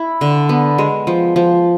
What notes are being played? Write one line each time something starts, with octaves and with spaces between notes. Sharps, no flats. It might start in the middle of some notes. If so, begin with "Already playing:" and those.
Already playing: E4
D3
B3
G#3
F3
F3